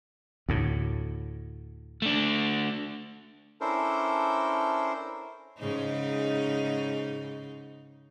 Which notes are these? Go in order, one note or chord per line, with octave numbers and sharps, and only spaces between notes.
D2 A2
A3 D4
C#4 D4 E4 A4 A#4 C5
G#2 C#3 D#4